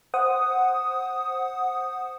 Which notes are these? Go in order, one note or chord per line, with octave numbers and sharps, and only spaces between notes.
C5 F#5 D#6